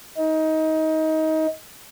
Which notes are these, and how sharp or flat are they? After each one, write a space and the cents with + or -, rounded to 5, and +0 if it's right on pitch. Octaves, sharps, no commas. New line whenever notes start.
D#4 +20